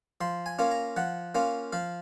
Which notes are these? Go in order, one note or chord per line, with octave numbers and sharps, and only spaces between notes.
F3 C6
G#5
A#3 C#4 F4
A#5
F3 F#5
A#3 C#4 F4
F3 F5